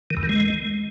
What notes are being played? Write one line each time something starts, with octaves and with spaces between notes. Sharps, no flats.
D#3
E2
D#3
G#3